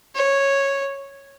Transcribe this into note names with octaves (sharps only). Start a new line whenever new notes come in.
C#5